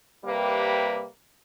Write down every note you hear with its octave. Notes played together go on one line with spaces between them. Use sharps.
C3 G3 A#3 G4 B4